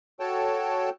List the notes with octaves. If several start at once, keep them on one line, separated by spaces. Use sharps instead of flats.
F#4 A4 C#5 G5 A5